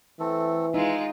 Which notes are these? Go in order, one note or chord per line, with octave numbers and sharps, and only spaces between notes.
E3 A3 C4 A4
G#3 D#4 F4 E5